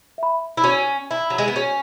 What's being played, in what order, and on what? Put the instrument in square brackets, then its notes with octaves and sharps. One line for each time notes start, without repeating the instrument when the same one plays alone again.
[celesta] E5 B5
[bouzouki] E4
[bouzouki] C#4 [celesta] F#4
[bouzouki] E4 [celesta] E5 B5
[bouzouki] F#3
G#3
B3
[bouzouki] C#4 [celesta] F#4